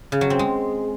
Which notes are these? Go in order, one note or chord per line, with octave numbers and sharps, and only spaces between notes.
C#3
F#3
C4
G#3